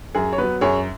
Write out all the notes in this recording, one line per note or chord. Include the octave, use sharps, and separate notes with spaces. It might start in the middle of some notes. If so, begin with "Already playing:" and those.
F#2 G#4
C#5
F#3 B3 B4
F#2 G#4 C#5